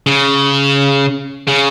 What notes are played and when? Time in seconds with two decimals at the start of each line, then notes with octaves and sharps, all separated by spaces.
0.07 C#3
1.47 C#3